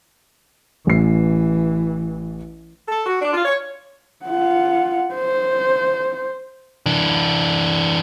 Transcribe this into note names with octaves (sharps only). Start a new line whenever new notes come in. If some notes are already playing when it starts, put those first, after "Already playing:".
A1 E3 C7
A4
F#4
D4
F4
C#5
F4 F#5
C5
E3 D4